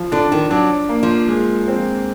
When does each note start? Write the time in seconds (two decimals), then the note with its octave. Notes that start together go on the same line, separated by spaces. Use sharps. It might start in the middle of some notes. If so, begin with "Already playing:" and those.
Already playing: F3
0.12 D3 D4
0.32 D#3
0.50 F#3 D4
0.89 A#3
1.03 F3
1.28 G#3
1.68 C4